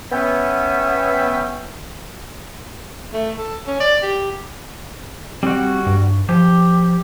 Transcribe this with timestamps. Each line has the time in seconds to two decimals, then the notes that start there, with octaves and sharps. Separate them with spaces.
0.12 B3 C#4 E5 G5
3.13 A3
3.37 A4
3.67 C#4
3.80 D5
4.02 G4
5.43 G3 C4 F#4
5.87 G2
6.29 F3 G4